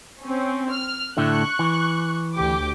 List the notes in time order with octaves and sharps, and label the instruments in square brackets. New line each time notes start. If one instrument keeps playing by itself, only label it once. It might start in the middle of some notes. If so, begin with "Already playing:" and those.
[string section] C4 C#4
F6
[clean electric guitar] A2 D3 A3 [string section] C#6 F#6
[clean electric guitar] E3
[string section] D2 G4 D6